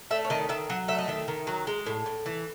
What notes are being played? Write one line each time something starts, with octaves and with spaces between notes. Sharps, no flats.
A3 E5
C#5
D#3 D#5
D#3 E5
F#3 F#5
A3 E5
D#5
D#3 E5
D#3
F#3
G#3
A2
A2
E3